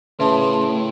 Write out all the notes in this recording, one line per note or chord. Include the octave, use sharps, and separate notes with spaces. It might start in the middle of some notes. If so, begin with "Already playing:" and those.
A2 C#3 B4 E5 A5 C6